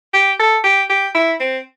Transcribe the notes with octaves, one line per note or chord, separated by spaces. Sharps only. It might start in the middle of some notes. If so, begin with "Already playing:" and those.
G4
A4
G4
G4
E4
C4